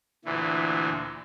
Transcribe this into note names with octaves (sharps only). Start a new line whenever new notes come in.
D2 A#2 E3